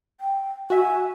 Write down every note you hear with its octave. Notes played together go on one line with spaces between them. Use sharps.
G5
F#4 E5 G#5